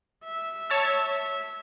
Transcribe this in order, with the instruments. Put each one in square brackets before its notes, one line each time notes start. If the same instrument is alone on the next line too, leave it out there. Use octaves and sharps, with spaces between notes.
[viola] E5
[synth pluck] C#5 A5 E6